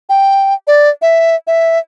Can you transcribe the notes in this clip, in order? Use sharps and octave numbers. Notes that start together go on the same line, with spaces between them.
G5
D5
E5
E5